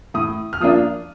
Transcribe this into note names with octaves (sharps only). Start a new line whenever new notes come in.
A2 D#6
F6
F3 A#3 D4 F4 D#6